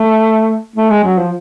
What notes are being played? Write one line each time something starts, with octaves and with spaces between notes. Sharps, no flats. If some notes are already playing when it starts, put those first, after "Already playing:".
Already playing: A3
A3
G#3
F#3
F3